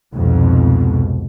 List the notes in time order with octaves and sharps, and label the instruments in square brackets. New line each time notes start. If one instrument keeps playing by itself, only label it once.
[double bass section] C2 F2 G#2 B2